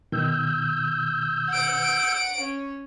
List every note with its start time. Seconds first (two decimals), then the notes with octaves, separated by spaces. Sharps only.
0.12 B2 D#3 E6 G6
1.49 F#5 D7
2.39 C#4